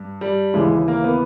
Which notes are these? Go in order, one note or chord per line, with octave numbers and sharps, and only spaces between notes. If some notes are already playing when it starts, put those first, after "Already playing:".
Already playing: G2
G3
D#2 C#3 E3 G#3
A#3
B3